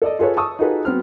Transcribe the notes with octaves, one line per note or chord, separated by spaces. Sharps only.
A4 D5 D#5
F4 G#4 A4 B4 C#5
A5 C#6 D#6 E6
D#4 F4 F#4 G#4 A4 B4
F#3 B3 C4 F6